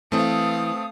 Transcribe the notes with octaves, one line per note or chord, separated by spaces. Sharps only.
E3 A3 C4 E4 A4 F5 D#6